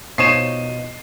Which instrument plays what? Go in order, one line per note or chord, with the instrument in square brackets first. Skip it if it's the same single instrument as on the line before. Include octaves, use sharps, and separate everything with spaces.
[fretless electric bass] B2 [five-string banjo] F3 D#4 C#5 [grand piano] C7 D#7 E7